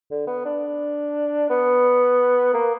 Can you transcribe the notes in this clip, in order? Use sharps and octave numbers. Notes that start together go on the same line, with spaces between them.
D3
B3
D4
B3
A#3